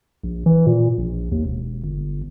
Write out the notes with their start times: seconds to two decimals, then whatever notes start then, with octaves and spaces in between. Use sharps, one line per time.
0.23 A#1
0.46 E3
0.66 A#2
0.98 A#1
1.32 D#2
1.45 E1
1.83 G1